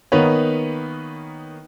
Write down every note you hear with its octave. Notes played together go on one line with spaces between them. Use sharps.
D#3 A#3 B3 D#4 B4 C#5